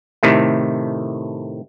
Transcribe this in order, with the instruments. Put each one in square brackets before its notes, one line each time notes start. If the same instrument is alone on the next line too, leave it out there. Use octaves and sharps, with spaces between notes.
[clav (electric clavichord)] A2 C3 D#3 A3